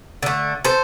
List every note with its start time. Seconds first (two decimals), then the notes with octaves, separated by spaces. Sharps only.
0.23 D3 A3
0.65 A4 C5